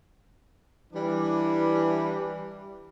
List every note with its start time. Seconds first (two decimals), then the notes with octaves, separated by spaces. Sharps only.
0.93 E3 G3 D4